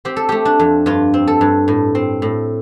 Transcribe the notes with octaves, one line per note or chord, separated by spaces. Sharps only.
C4 G4
A4
A3 G4
D4
F2
G2 F4
C4
A4
G2
A2
C4
A2